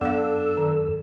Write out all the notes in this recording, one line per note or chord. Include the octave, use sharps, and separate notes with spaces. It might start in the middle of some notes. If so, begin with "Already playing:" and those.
F#2 B3 D4 A4 F5 E6
D#3